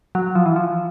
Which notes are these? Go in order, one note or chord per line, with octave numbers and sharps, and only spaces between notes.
F#3
F3
E3
F3